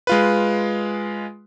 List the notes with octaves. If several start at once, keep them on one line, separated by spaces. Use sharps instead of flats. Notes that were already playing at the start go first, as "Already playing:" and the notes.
G#3 F4 B4